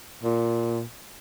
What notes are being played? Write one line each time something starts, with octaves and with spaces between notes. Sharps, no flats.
A#2